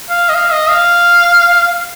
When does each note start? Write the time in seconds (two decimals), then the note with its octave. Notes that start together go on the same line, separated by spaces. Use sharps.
0.10 F5
0.29 D#5
0.35 F5
0.52 D#5
0.69 F5